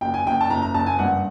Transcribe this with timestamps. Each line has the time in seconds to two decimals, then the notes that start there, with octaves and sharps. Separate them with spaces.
0.01 F#1 G5
0.14 G#5
0.25 F#1 G5
0.41 A5
0.50 F#1 A#5
0.62 A#5
0.74 F#1 A5
0.86 G#5
0.99 G2 F#5